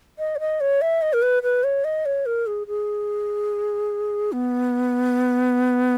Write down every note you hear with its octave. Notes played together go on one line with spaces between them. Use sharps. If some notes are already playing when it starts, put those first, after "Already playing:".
D#5
C#5
D#5
C#5
E5
D#5
A#4
B4
B4
C#5
D#5
C#5
A#4
G#4
G#4
B3